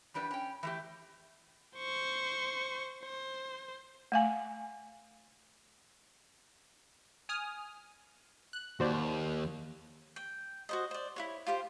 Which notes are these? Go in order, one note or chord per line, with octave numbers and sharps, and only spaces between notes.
E2 G3 D4 B4
C#4 G5
E3 A3 G4
C5 C#6
C5
A3 F5 G#5
G#5 D#6 F6
F#6
D#2 F#4 C5 D5
G5
F#4 C5 D#5
C5 D5
E4 F#4 C#5
F4 G4 C5 F5